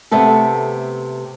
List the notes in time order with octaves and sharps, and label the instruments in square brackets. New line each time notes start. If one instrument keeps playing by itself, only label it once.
[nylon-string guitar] C3 A3 B3 A4